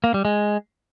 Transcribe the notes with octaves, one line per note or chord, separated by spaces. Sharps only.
A#3
G3
G#3